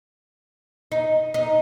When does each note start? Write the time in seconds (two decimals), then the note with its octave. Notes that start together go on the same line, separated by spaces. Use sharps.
0.92 D#4
1.34 D#4